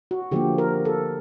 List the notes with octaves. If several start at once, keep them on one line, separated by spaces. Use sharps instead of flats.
F#4
D3 F3 A#3 G4
A#4
A4